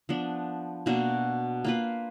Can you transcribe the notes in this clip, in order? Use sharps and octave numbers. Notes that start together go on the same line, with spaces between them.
F3 B3 D4
B2 A#3 D4 F#4
A#3 F4 B4